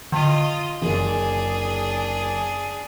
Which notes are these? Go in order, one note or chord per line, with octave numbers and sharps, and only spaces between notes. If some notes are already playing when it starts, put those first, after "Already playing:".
D3 F4 D#5
F#1 D4 G#4